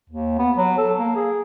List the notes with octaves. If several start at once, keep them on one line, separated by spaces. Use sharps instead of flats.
D#2
B3
F#3
A4
A#3
G#4